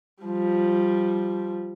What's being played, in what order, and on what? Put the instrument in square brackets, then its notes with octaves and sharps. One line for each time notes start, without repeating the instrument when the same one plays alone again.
[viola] F3 G3